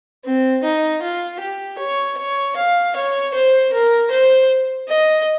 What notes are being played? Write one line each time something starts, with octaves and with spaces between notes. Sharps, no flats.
C4
D#4
F4
G4
C#5
C#5
F5
C#5
C5
A#4
C5
D#5